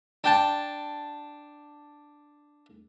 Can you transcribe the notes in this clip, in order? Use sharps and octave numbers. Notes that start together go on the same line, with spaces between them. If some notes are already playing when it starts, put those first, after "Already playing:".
D4 G5 A5